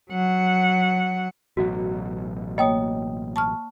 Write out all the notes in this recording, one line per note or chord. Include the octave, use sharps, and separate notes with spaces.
F#3 F#5
A1 B2 F#3 F#4
A#3 C#5 D#5 G5 D#6
A5 C#6 F6